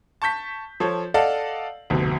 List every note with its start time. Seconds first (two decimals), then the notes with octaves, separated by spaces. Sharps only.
0.22 A5 C#6 G6 B6
0.80 F3 A4 C#5
1.14 A4 D5 D#5 F5 F#5 A5
1.90 F1 D2 B2